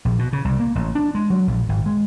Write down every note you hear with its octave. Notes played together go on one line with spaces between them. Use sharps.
A#1
B2
C#3
C2
A#3
A1
D4
G#3
F#3
A#1
G#1
G#3